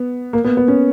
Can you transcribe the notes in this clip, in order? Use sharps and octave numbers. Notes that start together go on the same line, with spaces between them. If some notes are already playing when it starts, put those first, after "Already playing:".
Already playing: B3
A#3
B3
B3
C#4